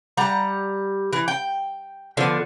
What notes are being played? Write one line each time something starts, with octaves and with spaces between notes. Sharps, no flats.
G3 F#5 A#5
E3
G5
D3 F3 B3